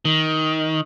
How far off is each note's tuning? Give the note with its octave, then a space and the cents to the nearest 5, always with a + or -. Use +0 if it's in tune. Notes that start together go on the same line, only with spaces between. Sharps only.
D#3 +15